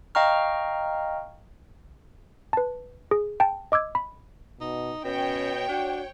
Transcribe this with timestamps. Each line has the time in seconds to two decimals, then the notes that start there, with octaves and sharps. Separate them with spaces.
0.15 D#5 F5 G5 A#5 C#6 F6
2.53 B4 A5
3.11 G#4
3.40 G5 A5
3.72 D#5 D6 E6 G#6
3.95 B5
4.61 B2 D#4
5.05 B2 C#4 C#5 G5
5.69 D4 F#4